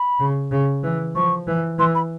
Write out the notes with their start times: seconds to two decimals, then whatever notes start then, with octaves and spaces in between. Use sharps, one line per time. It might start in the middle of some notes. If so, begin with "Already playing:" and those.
Already playing: B5
0.19 C#3
0.51 C#3
0.83 E3
1.15 F3 C#6
1.47 E3
1.79 E3 C6
1.94 B5